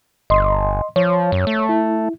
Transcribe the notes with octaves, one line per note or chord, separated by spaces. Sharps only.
G1 D#5 C6
F3 C#5
F#2
A3
E4